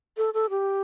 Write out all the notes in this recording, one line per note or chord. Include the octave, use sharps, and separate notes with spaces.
A4
A4
G4